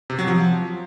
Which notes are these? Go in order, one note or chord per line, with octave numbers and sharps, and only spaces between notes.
C3
F#3
F3